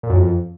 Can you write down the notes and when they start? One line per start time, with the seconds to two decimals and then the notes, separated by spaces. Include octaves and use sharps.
0.03 A#2
0.10 F#2
0.16 F2